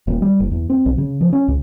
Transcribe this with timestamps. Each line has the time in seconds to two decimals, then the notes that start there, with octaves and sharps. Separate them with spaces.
0.07 D#1
0.22 G3
0.40 F#1
0.51 E2
0.70 C4
0.86 B1
0.98 C#3
1.21 F3
1.33 C#4
1.48 C#2